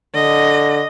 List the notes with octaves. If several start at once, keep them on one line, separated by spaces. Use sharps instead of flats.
D3 D#5